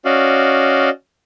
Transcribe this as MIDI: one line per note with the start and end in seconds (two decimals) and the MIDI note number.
0.05 0.90 61
0.05 0.90 66
0.05 0.90 74
0.05 0.90 75
0.05 0.90 77